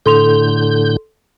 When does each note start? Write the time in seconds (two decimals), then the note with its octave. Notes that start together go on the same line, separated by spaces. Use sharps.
0.06 A2 D3 A4 C6 G6 F7